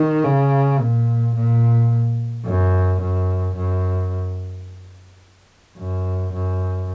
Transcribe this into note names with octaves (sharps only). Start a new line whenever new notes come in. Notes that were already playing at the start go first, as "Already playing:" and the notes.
Already playing: D#3
C#3
A#2
A#2
F#2
F#2
F#2
F#2
F#2